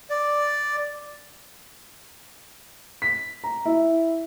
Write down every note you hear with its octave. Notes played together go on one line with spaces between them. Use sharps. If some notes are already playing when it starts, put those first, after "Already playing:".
D5
B6
A#5
E4